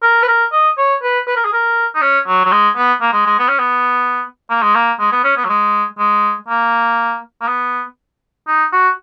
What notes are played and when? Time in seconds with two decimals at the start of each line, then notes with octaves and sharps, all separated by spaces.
0.03 A#4
0.23 B4
0.28 A#4
0.52 D#5
0.78 C#5
1.03 B4
1.27 B4
1.36 A#4
1.45 G#4
1.53 A#4
1.95 D#4
2.02 C#4
2.27 F#3
2.45 F#3
2.52 G#3
2.76 B3
3.01 A#3
3.13 G#3
3.26 G#3
3.39 B3
3.49 C#4
3.59 B3
4.50 A#3
4.62 G#3
4.75 A#3
4.99 G#3
5.12 B3
5.24 C#4
5.37 B3
5.45 F#3
5.49 G#3
5.99 G#3
6.49 A#3
7.41 A#3
7.48 B3
8.47 D#4
8.72 F#4